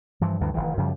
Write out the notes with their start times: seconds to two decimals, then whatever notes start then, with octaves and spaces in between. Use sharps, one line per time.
0.21 G2 E3 F3
0.41 D2 G2 D#3 E3
0.54 F1 C#2 D#3 E3
0.77 F#2 C#3 F3 G3